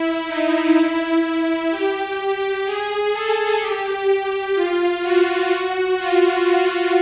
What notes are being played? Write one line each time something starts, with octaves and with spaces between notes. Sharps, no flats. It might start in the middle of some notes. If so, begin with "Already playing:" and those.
Already playing: E4
D#4
E4
G4
G#4
A4
G4
F4
F#4
F4